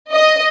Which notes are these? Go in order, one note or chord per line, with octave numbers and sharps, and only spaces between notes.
D#5